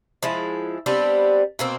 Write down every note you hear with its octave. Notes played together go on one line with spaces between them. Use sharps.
F3 G#3 E4
G3 B3 C4 D4
B2 A#3 C4